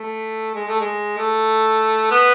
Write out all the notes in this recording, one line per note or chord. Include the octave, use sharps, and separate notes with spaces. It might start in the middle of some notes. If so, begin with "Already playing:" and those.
Already playing: A3
G#3
A3
G#3
A3
B3